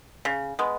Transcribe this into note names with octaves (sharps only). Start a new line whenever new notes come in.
C#3
G#3 B3